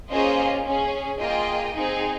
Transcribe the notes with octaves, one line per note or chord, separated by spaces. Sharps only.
A#3 C#4 F4 G#4 C5 D#5
C#4 G#4
A#3 F4 G#4 D#5 G5
C4 D#4 G#4